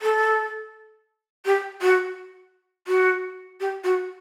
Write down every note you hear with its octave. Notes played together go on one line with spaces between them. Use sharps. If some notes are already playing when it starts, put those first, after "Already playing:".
A4
G4
F#4
F#4
G4
F#4